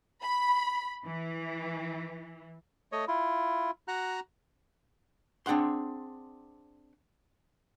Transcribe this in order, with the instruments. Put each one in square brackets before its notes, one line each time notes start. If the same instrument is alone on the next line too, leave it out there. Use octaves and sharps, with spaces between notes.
[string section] B5
E3
[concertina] A3 C#5 D#5
E4 F4
F#4 F#5 A#5 F#6
[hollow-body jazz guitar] C4 D4 G#4 F#5 C6